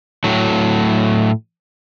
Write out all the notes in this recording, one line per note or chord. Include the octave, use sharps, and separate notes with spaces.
A2 F#3